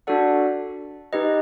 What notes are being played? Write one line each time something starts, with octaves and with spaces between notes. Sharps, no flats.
D4 F#4 A4 D5 F#5
D#4 G4 B4 D#5